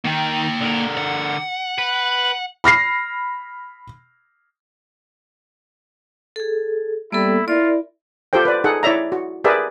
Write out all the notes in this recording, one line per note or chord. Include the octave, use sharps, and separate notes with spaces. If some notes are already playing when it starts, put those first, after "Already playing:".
D#3 A#3 G5
D3 A#4
F#5
B4
B5 F6 A#6 C7
G#4 A4
G3 A#3 B3 E4 A4
E4 F4 A#4 D5
F4 G4 A4 C5 G5
B4 D5
D#4 G#4 A4 F#5
E4 C#5 D5 E5 A#5
F#4
G4 G#4 A#4 B4 D5 E5